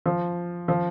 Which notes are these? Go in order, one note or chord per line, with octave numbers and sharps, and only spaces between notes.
F3
F3